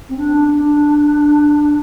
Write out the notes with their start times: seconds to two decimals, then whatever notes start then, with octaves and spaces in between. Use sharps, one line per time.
0.09 C4
0.17 D4
0.48 D4